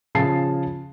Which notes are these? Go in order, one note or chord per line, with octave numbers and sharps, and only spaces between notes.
C#3 F3 G#4 A5 C7